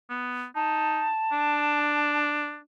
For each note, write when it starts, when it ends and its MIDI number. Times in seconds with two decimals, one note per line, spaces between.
0.10 0.45 59
0.55 1.07 63
0.55 2.23 81
1.32 2.59 62